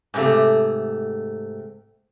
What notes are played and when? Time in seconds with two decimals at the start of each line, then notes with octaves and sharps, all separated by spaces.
0.14 G#2 C3 A3